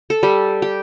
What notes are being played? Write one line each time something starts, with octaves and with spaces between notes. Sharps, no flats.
A4
G3
G4